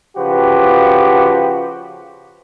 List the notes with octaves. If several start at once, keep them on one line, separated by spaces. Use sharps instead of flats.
C#3 F3 F#4 G4 B4